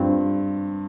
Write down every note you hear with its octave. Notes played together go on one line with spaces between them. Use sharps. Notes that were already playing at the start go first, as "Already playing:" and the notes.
Already playing: G2 F3 C4